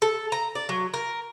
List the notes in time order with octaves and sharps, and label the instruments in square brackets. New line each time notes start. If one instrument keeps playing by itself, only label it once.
[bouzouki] A4
A#5
D5
F#3
A#4